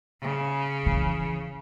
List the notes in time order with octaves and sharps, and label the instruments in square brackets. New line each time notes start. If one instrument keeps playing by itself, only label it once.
[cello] C#3
[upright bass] E3